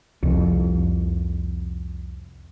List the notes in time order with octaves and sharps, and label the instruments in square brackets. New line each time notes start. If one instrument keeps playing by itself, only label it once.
[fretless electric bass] C2 F2